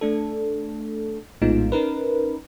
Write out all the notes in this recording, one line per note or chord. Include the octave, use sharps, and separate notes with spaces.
A3 D4 A4
A#1 A2 G#3 B3 D#4 F4
C#4 D#4 A#4 B4